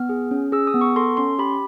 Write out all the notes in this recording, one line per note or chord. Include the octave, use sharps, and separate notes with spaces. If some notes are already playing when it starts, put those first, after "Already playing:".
Already playing: B3 F6
G#4
C#4
G#4 E6
D#6
B3
C#6
A4 C6
C#4 C6
G4 B5